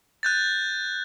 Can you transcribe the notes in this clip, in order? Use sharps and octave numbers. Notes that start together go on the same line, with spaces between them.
F#6 G6 A6